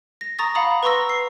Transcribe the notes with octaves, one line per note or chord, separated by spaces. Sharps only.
A#6
A#5 C#6 D#6 A6 A#6
F5 F#5 A#5 B5 D#6
B4 A#5 C6 C#6 E6 A#6
C7